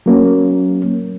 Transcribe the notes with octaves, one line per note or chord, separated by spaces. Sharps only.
F#3 A#3 C#4